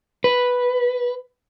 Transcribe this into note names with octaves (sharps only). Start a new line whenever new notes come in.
B4